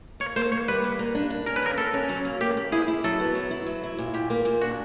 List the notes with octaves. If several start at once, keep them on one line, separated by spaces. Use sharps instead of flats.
A#3 C#5
A#3 C5
A#3 C#5
G3 B4
A#3
A#3
D4
D4
C#4 A#4
B4
A#3 A#4
A#3 A4
C#4
F#3
A#3
A#3 G4
A#3
E4 G#4
E4
F#3 A4
B3
F#3
E4
F#3
E4
A#2
A#2 G4
A#3
A#2
D4 F#4